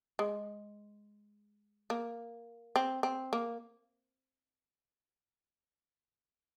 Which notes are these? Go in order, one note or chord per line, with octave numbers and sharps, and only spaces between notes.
G#3
A#3
C4
C4
A#3